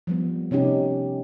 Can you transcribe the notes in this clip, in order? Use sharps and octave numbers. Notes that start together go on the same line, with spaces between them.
F3 G3 B3
C3 C#4 D#4 G4